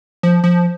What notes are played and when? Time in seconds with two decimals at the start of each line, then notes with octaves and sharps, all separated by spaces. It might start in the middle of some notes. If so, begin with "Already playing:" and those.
0.23 F3
0.44 F3